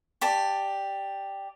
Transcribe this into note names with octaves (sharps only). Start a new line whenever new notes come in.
G4 D5 A5